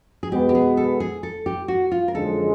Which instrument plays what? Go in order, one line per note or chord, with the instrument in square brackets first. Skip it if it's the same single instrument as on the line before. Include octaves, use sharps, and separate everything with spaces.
[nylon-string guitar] G#4
[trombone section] B2 G#3 B3 [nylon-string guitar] G4
[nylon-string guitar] G4
G#4
A4
G#4
A4
G4
F#4
F4
A#4
[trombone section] F#2 D3 F3 G#3 [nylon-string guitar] A4